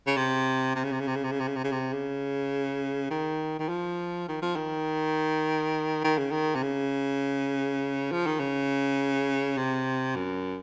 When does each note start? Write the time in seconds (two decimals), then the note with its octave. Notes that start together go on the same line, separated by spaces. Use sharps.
0.07 C#3
0.17 C3
0.76 C3
0.84 C#3
0.92 C3
1.00 C#3
1.08 C3
1.16 C#3
1.24 C3
1.32 C#3
1.40 C3
1.48 C#3
1.56 C3
1.64 C#3
1.72 C3
1.93 C#3
3.10 D#3
3.59 D#3
3.69 F3
4.28 D#3
4.42 F3
4.56 D#3
6.04 D#3
6.18 C#3
6.31 D#3
6.55 C3
6.63 C#3
8.12 F3
8.26 D#3
8.39 C#3
9.57 C3
10.16 F#2